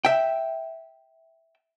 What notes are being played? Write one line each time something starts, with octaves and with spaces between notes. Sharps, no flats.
E5 G5